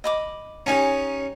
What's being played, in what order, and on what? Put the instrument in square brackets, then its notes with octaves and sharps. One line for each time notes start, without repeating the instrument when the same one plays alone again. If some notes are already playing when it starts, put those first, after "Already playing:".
[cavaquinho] D#5 B5 D6
[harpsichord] C#4 D#4 G4 [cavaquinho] C#5 G#5 A#5